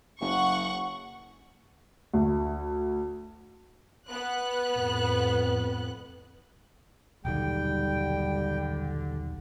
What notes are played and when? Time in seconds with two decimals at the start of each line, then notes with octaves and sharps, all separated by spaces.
0.21 F#1 F#5 C#6
2.14 D2
4.09 B3 F#6
4.76 F2 A2
7.25 D#1 B1 D3 D#3 G3 G5